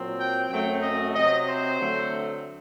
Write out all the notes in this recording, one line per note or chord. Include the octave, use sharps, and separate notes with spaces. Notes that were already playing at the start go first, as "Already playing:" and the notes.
Already playing: A#2 F#3 C4
G5
F#2 F#3 A3 C4 G5
D#5
C3 F#3 C4 D#5
C5
D3 F#3 A3 C4